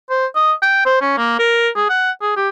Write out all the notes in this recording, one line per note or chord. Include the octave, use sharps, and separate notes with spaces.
C5
D#5
G5
C5
C#4
A#3
A#4
G#4
F#5
G#4
G4